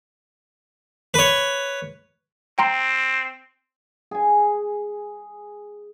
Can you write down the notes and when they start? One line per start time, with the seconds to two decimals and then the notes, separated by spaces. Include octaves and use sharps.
1.14 B4 C#5
2.59 C4 G5 A#5 C6
4.11 G#4 G#5